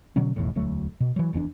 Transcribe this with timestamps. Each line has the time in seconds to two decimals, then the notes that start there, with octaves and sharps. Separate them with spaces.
0.16 B2 D3 F#3 C#4
0.36 F1 B1 E2 A2
0.55 E1 D2 F#3 A3
1.00 B2
1.16 E3 F#3
1.33 F1 E2 C4 D4